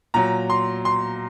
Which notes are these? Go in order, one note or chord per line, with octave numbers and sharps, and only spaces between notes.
A#2 F#3 A#5
C6
C6